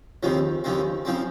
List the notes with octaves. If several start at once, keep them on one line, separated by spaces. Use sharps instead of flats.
D#2 C#3 F3 G#3 C4
D#2 C#3 F3 G#3 C4
C#3 F3 G#3 C4